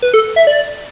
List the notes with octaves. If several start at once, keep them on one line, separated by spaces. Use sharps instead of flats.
B4
A4
E5
D5